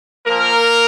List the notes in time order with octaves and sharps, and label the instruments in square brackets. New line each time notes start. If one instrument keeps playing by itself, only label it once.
[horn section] A#2 F3 A#3 A#4